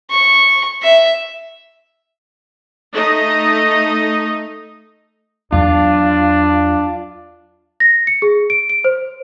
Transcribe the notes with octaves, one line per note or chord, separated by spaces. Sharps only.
C#6
E5
A3 D#4 D#5
E2 F#3 D4 F4
A#6
C#7
G#4
D7
D7
C5